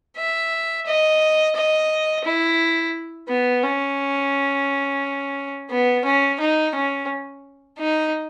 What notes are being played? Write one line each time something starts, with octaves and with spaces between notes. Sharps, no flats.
E5
D#5
D#5
E4
B3
C#4
B3
C#4
D#4
C#4
D#4